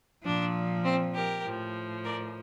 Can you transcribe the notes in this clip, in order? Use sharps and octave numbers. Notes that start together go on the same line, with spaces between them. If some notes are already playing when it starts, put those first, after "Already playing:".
A#2 F3 D4
C4
G4 A#4
A2 F3
A#4 D5